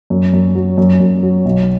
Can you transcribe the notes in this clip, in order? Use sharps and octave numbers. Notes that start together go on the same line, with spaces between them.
F#2
F#2
F#3
F#2
F#2
F#3
B1